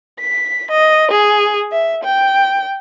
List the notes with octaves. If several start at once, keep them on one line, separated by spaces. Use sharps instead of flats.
B6
D#5
G#4
E5
G5